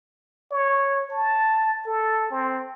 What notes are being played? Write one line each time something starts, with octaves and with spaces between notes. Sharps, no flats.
C#5
A5
A4
C4